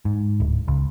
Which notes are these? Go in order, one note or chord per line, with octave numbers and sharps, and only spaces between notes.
G#2
D1
C#2